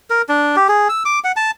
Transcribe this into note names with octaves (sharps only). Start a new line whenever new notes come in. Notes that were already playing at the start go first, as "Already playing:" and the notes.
A#4
D4
G4
G#4
E6
D6
F#5
A5